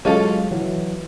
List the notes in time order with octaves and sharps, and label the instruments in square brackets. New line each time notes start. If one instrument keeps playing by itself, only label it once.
[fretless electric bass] F#3 G#3 [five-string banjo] C#4 F4 A4
[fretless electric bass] E3 F#3